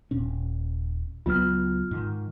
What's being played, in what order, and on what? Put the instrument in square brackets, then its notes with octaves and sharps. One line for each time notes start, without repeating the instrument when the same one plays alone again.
[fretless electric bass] D#1 A#2 C#4
[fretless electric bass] C#2 F#3 B3 [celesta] F4 F6
[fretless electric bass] G#2 D#3